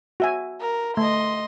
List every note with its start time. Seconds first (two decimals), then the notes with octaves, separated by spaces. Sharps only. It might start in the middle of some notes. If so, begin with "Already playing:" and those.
0.20 F#4 E5 G#5
0.60 A#4
0.97 A3 D#5 C6